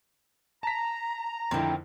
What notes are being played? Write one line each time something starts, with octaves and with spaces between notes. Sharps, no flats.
A5 A#5 B6
F2 D3 D#3 C4 E4